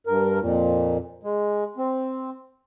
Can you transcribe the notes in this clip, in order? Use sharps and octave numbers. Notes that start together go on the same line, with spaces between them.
G2 A#4
F2 A#2
G#3
C4